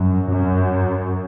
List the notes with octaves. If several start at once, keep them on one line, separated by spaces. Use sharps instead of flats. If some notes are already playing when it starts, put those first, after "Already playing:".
Already playing: F#2
F#2